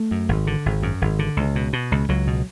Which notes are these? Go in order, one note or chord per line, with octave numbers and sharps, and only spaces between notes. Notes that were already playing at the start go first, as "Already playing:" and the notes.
Already playing: A3
F#2
G#1
D3
G#1
F#2
G#1
D3
C#2
B2
B2
C#2
C#2 F#3
B2